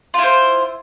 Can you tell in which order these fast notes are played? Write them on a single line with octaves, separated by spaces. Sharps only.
F4 E4 C5